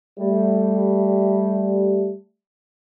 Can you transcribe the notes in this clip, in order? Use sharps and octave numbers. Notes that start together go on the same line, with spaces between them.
G3 A3